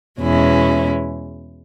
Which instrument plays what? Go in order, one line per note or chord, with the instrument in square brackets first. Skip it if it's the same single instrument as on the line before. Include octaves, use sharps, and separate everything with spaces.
[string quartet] E2 B2 G#3 C#4 E4